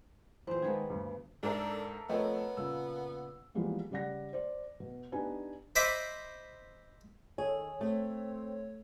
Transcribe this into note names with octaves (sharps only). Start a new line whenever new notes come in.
E2 A#2 C4 C5
D#3 G#3 A#3 B3 G#4
D2 G2
G#2 D4 A4 A#4 E5
F3 A3 B3 C4 C#5 D#5
A#2 C#3 E6
E3 F3 G3 G#3 A#3 B3
C#3 G3 D5 F#5 A#6
C5 D5
B2
B3 D4 D#4 G4 B4 G#5
C5 D#5 E5 B5 D6
D#3 G#4 A4 C#5
A3 C4